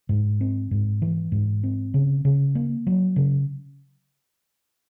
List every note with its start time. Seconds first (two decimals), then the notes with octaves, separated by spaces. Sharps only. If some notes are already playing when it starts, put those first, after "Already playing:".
0.09 G#2
0.41 C4
0.71 G#2
1.02 E3
1.32 G#2
1.63 C4
1.94 C#3
2.25 C#3
2.55 A#3
2.87 F#3
3.16 C#3